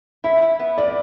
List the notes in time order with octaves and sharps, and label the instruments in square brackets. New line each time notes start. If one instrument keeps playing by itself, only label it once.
[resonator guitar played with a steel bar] E4 [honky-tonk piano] E5
[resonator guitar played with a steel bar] E4
B3
[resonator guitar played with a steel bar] A2 [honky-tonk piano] D5